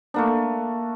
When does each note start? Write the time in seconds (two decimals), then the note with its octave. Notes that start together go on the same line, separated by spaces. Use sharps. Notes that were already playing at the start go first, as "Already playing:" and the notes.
0.14 A3 A#3 D4